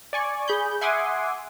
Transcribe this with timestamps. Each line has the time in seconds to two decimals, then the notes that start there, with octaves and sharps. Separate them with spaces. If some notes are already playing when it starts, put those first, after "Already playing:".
0.13 D5 G#5 C#6
0.48 G#4 B5 G6
0.81 E5 F#5 G#5 C6 D6 D#6